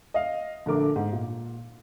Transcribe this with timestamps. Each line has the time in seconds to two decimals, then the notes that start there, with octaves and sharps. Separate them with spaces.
0.14 D#5 F5
0.66 A#1 D3 A3 A#4 D6
0.96 G#2
1.12 A#2